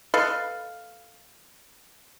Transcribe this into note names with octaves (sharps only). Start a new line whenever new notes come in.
A4 B4 D#5 F5